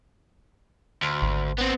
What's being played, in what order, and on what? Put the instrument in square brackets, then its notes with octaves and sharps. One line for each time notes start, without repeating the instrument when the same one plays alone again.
[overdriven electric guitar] D2
[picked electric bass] G#1
[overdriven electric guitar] B3 C4